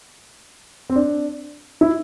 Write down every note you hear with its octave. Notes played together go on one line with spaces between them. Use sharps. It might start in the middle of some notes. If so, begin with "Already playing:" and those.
C4
D4
E4